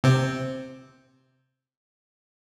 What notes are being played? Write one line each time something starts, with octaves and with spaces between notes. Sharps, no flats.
C3 C4